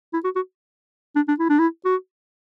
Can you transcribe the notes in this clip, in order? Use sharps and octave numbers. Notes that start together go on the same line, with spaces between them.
E4
F#4
F#4
D4
D4
E4
D4
E4
F#4